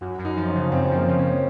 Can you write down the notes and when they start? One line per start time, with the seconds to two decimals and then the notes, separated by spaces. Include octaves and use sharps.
0.01 F#2 F#4
0.19 F#2
0.25 D#4
0.36 F3
0.48 C#4
0.55 C#3
0.66 C#4
0.72 F#2 C4
0.90 F3
0.96 A#3
1.07 C#3
1.19 C#4